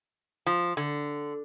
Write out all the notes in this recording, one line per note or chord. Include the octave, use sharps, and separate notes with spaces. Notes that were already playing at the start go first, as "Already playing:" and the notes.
F3
D3